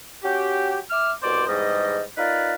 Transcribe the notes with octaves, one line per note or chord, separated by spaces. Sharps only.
C#4 F#4 G4
E5 D6 F6
C2 B2 C5 D5 D6
E2 G#2 G3 D#5
D#4 F4 A#4 B4 D5